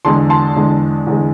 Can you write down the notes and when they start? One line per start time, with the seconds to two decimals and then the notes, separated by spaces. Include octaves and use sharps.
0.05 E2 D3 G#3 A5 C6
0.30 A5 C6
0.56 E2 D3 G#3
1.07 E2 D3 G#3